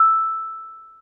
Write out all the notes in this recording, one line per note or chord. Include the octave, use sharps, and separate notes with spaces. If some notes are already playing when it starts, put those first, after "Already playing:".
Already playing: E6